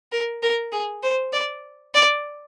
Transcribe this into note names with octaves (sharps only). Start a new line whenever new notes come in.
A#4
A#4
G#4
C5
D5
D5